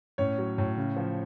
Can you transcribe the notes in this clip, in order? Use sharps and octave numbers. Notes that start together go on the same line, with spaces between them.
A2 C#4 C#5
F#3
A2
C#3
F3